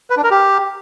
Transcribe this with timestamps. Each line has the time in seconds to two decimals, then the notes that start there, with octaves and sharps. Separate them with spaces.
0.10 B4
0.17 D4
0.24 A#4
0.31 G4